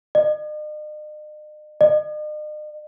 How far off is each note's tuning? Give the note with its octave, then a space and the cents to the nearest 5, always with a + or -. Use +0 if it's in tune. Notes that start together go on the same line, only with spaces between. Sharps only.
D#5 -45
D#5 -45